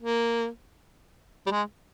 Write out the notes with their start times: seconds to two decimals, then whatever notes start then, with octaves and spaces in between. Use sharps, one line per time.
0.02 A#3
1.46 G3
1.51 G#3